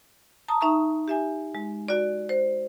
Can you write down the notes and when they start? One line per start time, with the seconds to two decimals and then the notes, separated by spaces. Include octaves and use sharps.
0.48 A5 A#5 D#6
0.61 D#4 E5 A#5 C#6
1.08 G4 E5 G#5
1.55 G#3
1.88 F#4 D5
2.29 C5